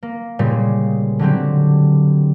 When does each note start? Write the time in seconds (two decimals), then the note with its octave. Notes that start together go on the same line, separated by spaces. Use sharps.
0.03 A#3
0.39 A#2 C#3 G3 G#3
1.19 D3 F#3 C4 G4